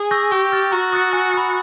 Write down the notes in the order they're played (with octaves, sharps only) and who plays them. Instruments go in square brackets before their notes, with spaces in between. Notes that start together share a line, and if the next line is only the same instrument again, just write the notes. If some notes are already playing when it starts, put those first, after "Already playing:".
Already playing: [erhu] G#4
[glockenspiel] C#6 E6 G6 A#6
[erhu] G4 [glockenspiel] C#6
[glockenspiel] F6 A6
[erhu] F#4 [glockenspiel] A#5
[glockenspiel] D#6 F#6 A6 C#7
G#5
B5 D#6